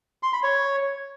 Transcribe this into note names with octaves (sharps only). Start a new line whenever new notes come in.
C6
B5
C#5